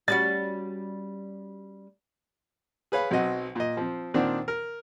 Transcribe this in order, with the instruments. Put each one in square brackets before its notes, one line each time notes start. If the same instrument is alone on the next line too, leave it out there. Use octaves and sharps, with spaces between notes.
[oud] G3 C#4 F#4 [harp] A6
[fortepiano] G#4 B4 C#5 F5
B1 F#3 C4 D#5 F#5
A#2 D#5
F3 C4
A#2 D#3 C4 D4 F#5
A#4